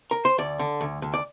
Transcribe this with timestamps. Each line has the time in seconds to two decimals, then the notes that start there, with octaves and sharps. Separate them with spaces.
0.11 A#4
0.25 C5
0.38 D2 D5
0.59 D3
0.81 D2
1.02 D2
1.14 D5